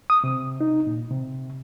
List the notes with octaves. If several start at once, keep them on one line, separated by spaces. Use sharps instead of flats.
D#6
C3
D#4
A#2
C3